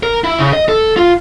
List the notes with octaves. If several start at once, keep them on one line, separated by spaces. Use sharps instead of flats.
A#4
E4
C#3
D#5
A4
F4